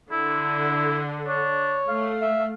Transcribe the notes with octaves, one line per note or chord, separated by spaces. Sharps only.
D3 E4
D4 C#5
A3 F5
E5